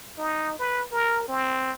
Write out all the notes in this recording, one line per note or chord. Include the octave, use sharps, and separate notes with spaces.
D#4
B4
A#4
C4